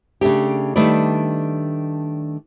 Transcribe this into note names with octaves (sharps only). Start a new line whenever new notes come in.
C#3 A3 D4 G4
D#3 G3 A3 D4 B4 D5